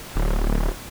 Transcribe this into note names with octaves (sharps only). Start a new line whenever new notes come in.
D1